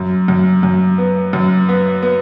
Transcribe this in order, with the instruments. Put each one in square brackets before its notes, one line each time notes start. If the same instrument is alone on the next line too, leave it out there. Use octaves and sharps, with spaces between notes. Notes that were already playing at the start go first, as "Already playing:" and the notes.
Already playing: [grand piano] F#2
F#2
F#2
B3
F#2
B3
B3